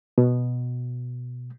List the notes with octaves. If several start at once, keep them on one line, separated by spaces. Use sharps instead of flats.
B2